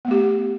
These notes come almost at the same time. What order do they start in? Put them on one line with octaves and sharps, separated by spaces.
B3 A3 G4